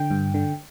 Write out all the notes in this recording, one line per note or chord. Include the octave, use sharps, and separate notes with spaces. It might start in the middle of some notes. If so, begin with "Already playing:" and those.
Already playing: D3 G5
G2
D3